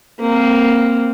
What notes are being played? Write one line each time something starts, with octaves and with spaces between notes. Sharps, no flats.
A#3 C4